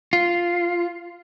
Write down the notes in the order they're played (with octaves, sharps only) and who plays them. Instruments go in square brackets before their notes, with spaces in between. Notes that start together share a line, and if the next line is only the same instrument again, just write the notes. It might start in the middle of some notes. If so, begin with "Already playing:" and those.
[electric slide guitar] F4